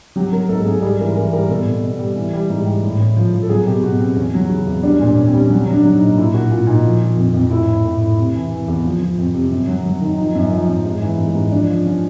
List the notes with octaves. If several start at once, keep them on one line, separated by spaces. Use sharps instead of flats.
F#3 G4
F#3 A#4
G#2 A4
G#2 G#4
G3 G#4
E3 A#4
E3 A#4
G3 A#4
B2 A4
B2
B2
G3
E3
G3
G#2
G3
A2
A2
F3
F3
A4
F#3 G#4
B2 G4
B2 F#4
B2 C4
E2 C#4
F#3
C#3 F#4
E2
G3 D4
C#4
A#2 D4
A#2 C#4
C4
G3
C#4
F#3 C#4
F#3
D4
F#3
D#4
A#2
A#2 E4
A#2 F#4
A#2 F4
A#2 D#4
F3
F3
F2
F2
A2 E4
A2
A2
A2
C3
E3
E3
E2
F3
F3
F2
C3
F#2
F#3
F#3
D#3
F3 D#4
F#2
F3
F#2
G#2
E3
G#2
G#2
F3 D4
F3
F3 C#4